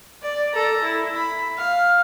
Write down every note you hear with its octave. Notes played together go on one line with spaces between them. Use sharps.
D5
A4 A#5
E4
B5
F5